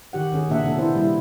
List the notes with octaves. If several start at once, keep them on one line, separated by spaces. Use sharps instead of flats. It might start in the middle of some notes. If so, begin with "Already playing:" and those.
D#3 G4 F#5
D#3 C#4 G#4
A#2 C#3 A#3 D4 E5 F#5
C3 A#3 D4 A4
B3 E4 A4 C5
G3 E4